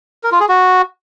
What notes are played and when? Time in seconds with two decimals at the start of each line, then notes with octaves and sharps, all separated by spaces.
0.24 A#4
0.32 F4
0.40 G#4
0.49 F#4